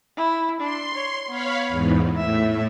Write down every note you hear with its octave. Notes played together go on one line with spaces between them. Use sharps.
E4
D4 C6
C#5
B3 C#5 F5 B5
E2 G#2
A2 E5